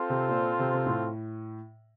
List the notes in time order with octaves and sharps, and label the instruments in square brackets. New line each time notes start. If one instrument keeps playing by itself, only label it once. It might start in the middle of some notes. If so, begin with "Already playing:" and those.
Already playing: [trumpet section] C4 F4 A4 C5
[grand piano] C3
A#2
C3
C3
A2